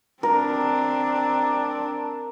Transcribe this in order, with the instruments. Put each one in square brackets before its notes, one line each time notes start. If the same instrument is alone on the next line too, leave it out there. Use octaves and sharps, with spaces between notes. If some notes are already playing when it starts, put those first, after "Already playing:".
[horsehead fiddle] C4 D4 [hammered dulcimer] A#4